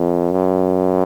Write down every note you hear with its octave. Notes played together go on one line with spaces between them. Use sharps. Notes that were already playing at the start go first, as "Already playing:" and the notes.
Already playing: F2
F#2